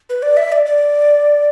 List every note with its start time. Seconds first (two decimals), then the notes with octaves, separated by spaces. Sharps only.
0.09 B4
0.22 D5
0.37 E5
0.52 D5
0.66 D5